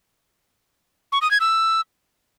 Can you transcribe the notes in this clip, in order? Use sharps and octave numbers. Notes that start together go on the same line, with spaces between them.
C#6
D#6
G#6
E6